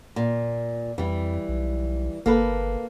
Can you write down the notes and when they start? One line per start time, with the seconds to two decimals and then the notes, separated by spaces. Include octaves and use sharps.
0.16 A#2
0.98 F2 E3 G3
1.49 B1
2.26 G1 A#3 A4 B4